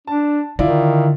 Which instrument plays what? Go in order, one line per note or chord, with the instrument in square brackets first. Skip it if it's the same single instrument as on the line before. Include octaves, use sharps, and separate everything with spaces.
[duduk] D4 [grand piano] A5
[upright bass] D3 [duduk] D#3 [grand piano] E4 F4 D5